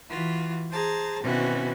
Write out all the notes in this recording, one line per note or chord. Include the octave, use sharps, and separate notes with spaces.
E3 F4 F#4
G#4 C5 A5 A#5
B2 D#3 E3 C4 C#4 F#4